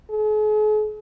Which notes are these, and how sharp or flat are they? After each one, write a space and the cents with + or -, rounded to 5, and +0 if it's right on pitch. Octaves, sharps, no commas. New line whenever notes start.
G#4 +45